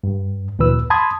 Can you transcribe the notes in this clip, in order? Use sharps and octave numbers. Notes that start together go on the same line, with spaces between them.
G2
D2 A#2 E3 B4 E6
A5 B5 C6 D#6 G#6